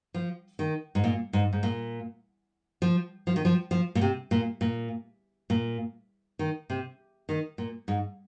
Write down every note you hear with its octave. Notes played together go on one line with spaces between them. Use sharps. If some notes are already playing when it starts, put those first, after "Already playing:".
F3
D#3
G#2
A#2
G#2
G#2
A#2
F3
F3
D#3
F3
F3
A#2
C3
A#2
A#2
A#2
D#3
C3
D#3
A#2
G#2